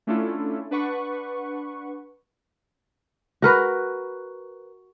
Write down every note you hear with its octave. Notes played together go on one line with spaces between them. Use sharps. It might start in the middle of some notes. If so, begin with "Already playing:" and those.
A3 C#4 D4 E4 F4 A4
D4 B4 F#5 C#6
F#4 A#4 B4